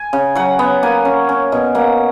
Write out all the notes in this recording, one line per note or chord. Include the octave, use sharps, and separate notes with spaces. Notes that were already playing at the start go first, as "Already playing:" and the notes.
Already playing: G#5
C#3
F#3 F#5
B3
A#3 G#5
C#4
C#4
B2
A#3 F#5